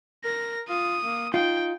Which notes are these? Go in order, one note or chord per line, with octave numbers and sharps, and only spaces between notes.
A#4 A#6
F4 D#6
A#3
D#4 F4 G5